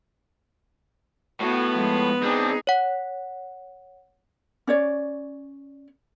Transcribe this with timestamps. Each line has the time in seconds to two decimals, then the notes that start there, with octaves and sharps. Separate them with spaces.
1.40 A2 B3 F#4 B4
1.73 F3 G#3
2.23 C4 D4 D#4 G#4
2.67 C#5 F#5
4.67 C#4 C#5 D5